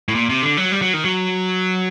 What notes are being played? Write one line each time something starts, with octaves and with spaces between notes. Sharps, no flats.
A2
A#2
C3
D3
F#3
G3
F#3
D#3
F#3